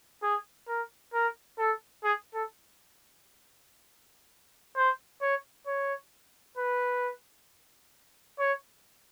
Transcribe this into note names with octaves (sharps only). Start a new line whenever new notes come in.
G#4
A#4
A#4
A4
G#4
A4
C5
C#5
C#5
B4
C#5